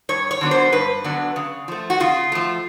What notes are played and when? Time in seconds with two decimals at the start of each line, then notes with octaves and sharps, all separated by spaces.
0.09 G2 C#5
0.31 C#5
0.41 D3 F#3 B3 D4
0.51 C5
0.72 G2 B4
1.04 D3 F#3 B3 D4
1.36 C#3
1.68 F3 A3
1.90 F#4
2.00 C#3 F4
2.32 F3 A3